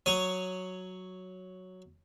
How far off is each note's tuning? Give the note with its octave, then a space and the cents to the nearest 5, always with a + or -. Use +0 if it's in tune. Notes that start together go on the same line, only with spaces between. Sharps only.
F#3 +0 C#5 +0 D#6 +0